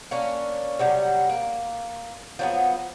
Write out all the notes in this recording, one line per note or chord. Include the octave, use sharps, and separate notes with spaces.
A#3 C#4 D4
C3 F#3 G3
A#3
F3 F#3 B3